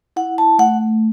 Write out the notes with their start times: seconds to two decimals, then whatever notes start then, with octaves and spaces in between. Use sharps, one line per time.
0.16 E4 F#5
0.38 A5
0.59 A3 F#5